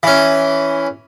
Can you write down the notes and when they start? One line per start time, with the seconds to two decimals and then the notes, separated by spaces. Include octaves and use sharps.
0.03 E3 C#4